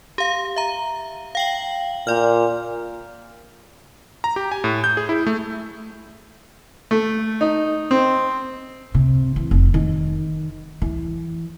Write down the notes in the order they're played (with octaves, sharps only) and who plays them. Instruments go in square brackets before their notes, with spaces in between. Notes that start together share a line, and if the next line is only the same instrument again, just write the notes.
[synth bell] G4 F5
E5 A#5
F5 G5 F#7
[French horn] A#2 [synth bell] D5 F6
[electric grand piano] A#5
G4
G#5
A2
G6
G#4
E4
A3
[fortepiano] A3
D#4
C4
[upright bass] C3
E3
F1
D#3
E3